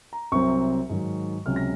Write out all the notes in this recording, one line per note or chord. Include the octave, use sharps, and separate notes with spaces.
A#5
C2 C3 F#3 C4 C#6
G#2 D#3 F#3
C#2 C3 F#3 C#4 F6
A#6